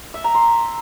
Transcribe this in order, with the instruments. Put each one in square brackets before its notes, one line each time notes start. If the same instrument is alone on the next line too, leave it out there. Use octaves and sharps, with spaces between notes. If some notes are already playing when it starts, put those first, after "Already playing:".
[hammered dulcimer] E5
A#5
C6